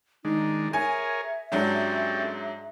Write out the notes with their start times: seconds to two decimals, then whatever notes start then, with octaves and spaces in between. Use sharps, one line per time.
0.25 D#3 G#3 D4 D#4
0.73 G#4 A#4 C#5 E5 G#5
1.52 G#2 F#3 C#4 D4 G4 A4